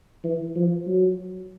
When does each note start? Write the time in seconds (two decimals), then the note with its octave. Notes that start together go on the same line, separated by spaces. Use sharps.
0.24 E3
0.56 F3
0.87 F#3